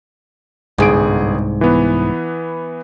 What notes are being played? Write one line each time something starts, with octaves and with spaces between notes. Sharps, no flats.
G1 C2 G#2 G#4 D7
E3 B3